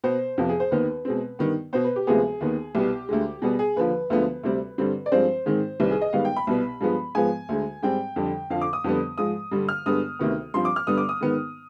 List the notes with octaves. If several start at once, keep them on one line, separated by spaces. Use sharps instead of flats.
B2 B3 C5
F2 C3 F3 B3
G#4
C5
D#2 D#3 B3 B4
B2 G#3 C4
G2 D#3 B3
B2 B3 C5
B4
G4
D2 C3 F3 G#3 B3 G#4
D#2 D#3 B3
C2 B2 B3 G4
D2 D3 G#3
B2 G3 B3 G#4
G#4
D#2 D3 F3 B4
D2 D3 F3 G#3 B3
D2 C3 G3 C4
G2 D3 G3 C4
D5
G2 F3 G#3 C4 C5
G#2 D#3 G#3 C4
C2 C3 D#3 B4
G#4
D#5
G#2 D#3 G3 B3 F5
G5
B5
C2 B2 B3
G2 F3 G#3 B3
G#2 F3 G#3 B3 G#5
D2 D3 G#3
G#2 G3 C4 G5
F2 D3 G3
F2 D3 F3 F5
D6
D#6
F2 D3 G3 B3
G#2 F3 G#3 D#6
G2 D3 G3
F6
G2 D3 G#3 B3 D#6
D2 C3 D#3 B3
G2 F3 C4 C6
D6
F6
G2 D3 G3 B3 D#6
D6
D#6
G#2 D#3 B3